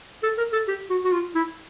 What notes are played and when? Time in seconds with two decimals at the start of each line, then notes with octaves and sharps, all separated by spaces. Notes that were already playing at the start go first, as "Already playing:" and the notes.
0.23 A4
0.38 A#4
0.53 A4
0.68 G4
0.90 F#4
1.05 F#4
1.12 F4
1.35 E4